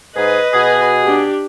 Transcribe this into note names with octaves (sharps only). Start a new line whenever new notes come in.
G#2 G#4 B4 D#5
B2 F#4 G#4
D4 G4